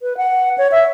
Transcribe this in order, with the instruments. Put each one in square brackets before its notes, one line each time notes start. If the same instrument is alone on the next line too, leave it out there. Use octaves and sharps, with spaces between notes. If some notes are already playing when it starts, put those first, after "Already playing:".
[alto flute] B4
F#5
C#5
E5